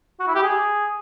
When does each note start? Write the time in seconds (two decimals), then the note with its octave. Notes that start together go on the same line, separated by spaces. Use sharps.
0.20 F#4
0.27 E4
0.35 G4
0.43 G#4